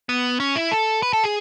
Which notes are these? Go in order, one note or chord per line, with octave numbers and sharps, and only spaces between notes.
B3
C#4
E4
A4
B4
A4
G#4